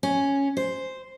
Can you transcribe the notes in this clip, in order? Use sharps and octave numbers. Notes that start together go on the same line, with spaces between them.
C#4
C5